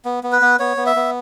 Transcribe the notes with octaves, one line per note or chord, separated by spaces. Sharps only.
B3
B3
B4
B3
B3 C#5
B3
E5
B3